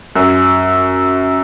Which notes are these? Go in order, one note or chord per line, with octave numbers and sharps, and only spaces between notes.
F#2